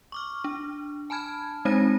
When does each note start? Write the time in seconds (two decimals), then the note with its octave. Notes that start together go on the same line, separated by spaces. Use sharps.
0.12 C#6 D6 F6
0.44 D4
1.10 G#5 A5 B5 F6 G#6
1.65 G#3 C4 D#4 C5 A#6 D#7